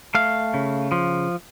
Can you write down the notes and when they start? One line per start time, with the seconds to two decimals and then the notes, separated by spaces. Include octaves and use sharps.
0.15 A3 F5
0.54 C#3
0.92 F3